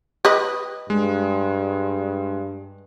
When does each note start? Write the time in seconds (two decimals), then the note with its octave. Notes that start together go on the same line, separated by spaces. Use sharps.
0.25 G4 B4 D#5
0.90 G2 G#3